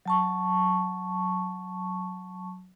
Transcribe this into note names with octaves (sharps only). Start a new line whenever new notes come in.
F#3 A5 C#6